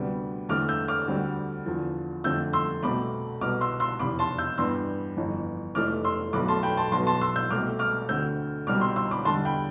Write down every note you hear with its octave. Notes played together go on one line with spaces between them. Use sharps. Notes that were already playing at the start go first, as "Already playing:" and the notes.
Already playing: D2 C3 G3 B3
E2 D3 A3 C4 D6 F6
E6 G6
D6 F6
D2 D3 G3 C4
E2 D3 F3
F2 D3 A3 C4 E6 G6
C6 E6
C2 B2 A3 C4 B5 D6
C2 B2 B3 D6 F6
C6 E6
C6 E6
F1 E2 C3 B5 D6
A5 C6
E6 G6
G2 E3 G3 B3 C6 E6
G1 F2 E3
F1 F2 E3 A3 D6 F6
C6 E6
B1 B2 A3 B5 D6
A5 C6
G5 B5
A5 C6
B1 B2 B3 A5 C6
A5 C6
C6 E6
E6 G6
C2 B2 A3 C4 D6 F6
D6 F6
D2 D3 A3 C4 E6 G6
C2 B2 G3 C4 D6 F6
C6 E6
C6 E6
B5 D6
E2 D3 G3 A5 C6
G5 B5